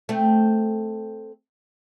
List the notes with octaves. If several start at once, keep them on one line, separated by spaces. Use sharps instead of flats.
A3 C4